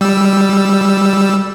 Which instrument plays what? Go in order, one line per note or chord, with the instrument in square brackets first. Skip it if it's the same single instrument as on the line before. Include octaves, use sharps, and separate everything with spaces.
[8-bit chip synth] G3 E6